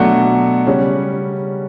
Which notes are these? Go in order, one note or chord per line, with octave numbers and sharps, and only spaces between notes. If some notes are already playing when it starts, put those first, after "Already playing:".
Already playing: B2 F#3 A3 D4 F#5
C#3 G3 C#4